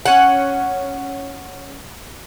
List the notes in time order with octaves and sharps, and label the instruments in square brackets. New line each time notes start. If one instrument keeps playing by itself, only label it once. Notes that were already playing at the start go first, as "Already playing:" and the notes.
[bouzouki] C#4 F#5